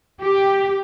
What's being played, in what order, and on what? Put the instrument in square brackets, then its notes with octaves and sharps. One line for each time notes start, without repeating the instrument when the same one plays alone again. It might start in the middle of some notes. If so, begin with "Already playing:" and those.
[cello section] G4